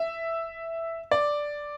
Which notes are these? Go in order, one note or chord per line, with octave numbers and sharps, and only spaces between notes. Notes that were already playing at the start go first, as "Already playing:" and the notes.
Already playing: E5
D5